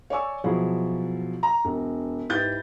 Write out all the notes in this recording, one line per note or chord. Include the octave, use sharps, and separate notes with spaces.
C#5 D5 G#5 C#6 E6
B2 F3 F#3 E4 F#4 G#4
A#5
E1
G#2 E4 G4 B4 G6 A6